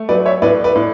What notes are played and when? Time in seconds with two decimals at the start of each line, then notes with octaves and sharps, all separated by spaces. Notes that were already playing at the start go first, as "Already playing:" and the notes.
Already playing: A3
0.09 F#3 B4 D5
0.26 C#5 E5
0.42 A2 B4 D5
0.64 B4 D5
0.76 A2